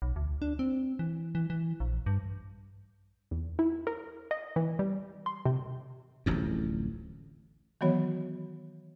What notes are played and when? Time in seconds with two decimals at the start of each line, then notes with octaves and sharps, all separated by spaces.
0.02 B1
0.16 D2
0.42 D4
0.59 C4
0.99 E3
1.35 E3
1.50 E3
1.80 A#1
2.06 G2
3.31 E2
3.59 E4
3.87 A#4
4.31 D#5
4.56 E3
4.79 G3
5.26 C6
5.45 C3
6.26 D1 A1 F2
7.81 D#3 E3 F#3 B3 F#4 C#5